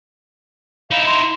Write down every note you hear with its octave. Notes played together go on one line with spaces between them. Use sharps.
D#4 E4 F5
C6